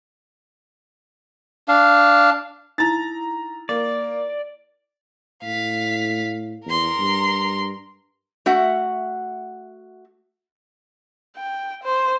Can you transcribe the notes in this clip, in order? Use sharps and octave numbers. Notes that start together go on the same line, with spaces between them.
D4 F5
D#4 E4 A#5 A6
A#3 D5
A2 F5 B6
E2 A#4 C6
G2
A3 F#4 E5 F#5
G5
C5